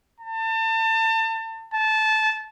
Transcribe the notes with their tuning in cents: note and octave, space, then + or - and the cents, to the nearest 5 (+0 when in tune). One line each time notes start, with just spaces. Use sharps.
A5 +30
A5 -15